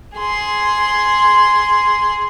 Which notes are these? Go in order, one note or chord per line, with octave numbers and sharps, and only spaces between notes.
G#4 C6